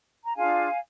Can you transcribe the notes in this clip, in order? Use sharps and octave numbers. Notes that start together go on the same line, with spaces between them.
A#5
D4 F4 G#4 F5 G#5